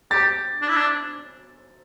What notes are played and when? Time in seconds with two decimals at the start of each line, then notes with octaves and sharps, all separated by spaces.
0.11 G4 A6
0.62 D4
0.69 E4
0.76 D4